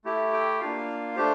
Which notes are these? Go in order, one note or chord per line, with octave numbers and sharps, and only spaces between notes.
A3 E4 G4
G5
A#3 D4 F4 F5
A3 D4 G4 C5